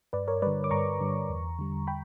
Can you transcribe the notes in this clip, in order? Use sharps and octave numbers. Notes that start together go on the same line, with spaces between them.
G2 B4 D5
A#4 C#5
D3 G3 B4 D5
D6
G2 A#5 C#6
D3 G3
E2
D3 G3
G5 B5